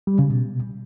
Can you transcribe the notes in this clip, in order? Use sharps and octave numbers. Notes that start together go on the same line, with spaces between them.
G3
C#3
B2